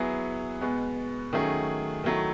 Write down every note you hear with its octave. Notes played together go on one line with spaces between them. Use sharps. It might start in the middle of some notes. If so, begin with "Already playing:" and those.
Already playing: F#3 B3 E4 G#4
B2 G#3 B3
D#3 F#3 A3 C#4 G#4
D#3 F#3 A3 E4